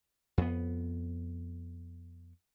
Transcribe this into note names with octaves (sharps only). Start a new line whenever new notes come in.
F2 B3